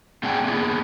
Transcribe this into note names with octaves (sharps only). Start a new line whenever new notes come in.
A3 C4 D4 G#4 F#5 G5
A#3 B3 F4 G#4